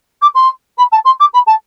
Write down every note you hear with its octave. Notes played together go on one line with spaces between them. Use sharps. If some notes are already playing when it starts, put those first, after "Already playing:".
D6
C6
B5
A5
C6
D6
B5
A5